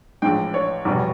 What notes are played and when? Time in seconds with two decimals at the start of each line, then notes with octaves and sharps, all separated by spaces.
0.22 A#1 A2 E3 G#3 G5
0.54 C#5
0.85 F1 E2 B2 G3